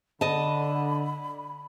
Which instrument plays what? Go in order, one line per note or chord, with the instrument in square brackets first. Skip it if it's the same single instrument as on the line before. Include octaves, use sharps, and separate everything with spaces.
[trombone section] D3 [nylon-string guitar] D#5 A5 [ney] B5